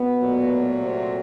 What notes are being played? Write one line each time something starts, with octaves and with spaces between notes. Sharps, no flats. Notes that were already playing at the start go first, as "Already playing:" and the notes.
Already playing: B2 B3
A#2 F#3 A3
C3 C4